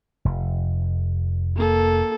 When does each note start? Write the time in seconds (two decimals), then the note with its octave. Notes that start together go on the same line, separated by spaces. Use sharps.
0.25 F1
1.56 A#3 A4